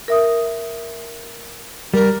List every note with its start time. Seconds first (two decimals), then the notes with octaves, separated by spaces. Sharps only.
0.08 A#4 E5 D#6
1.94 G3 A#4